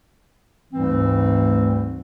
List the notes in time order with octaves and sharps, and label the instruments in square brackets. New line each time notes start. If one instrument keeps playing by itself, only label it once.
[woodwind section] D2 G#2 E3 G3 A3 C4